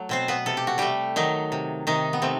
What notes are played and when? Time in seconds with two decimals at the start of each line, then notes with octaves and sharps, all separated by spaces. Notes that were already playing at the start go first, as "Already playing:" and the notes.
Already playing: F#3 A3
0.09 B2 C4 C5
0.28 B3 B4
0.46 C3 A4
0.57 G4
0.67 F#4
0.78 G3 A3 G4
1.16 D#3 F#3 D#4
1.52 C3
1.87 C3 D#3 D#4
2.13 B3
2.22 C3 A3 C4